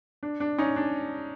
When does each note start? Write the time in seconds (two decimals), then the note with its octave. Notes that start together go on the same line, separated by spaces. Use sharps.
0.23 D4
0.40 D4
0.58 C#4 D#4
0.76 D4